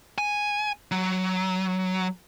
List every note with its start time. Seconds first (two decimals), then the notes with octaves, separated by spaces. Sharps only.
0.18 G#5
0.91 F#3